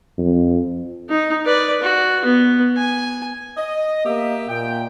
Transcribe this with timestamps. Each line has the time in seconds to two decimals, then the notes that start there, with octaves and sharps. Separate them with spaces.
0.18 F2
1.09 D#4
1.45 B4 D5
1.82 F#4
2.25 B3
2.78 G#5
3.57 D#5
4.05 A#3 G4 D#5 E5
4.49 A#2 G5